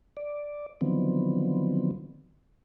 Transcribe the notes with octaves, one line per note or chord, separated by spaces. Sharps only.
D5
D3 D#3 F3 F#3 B3 C4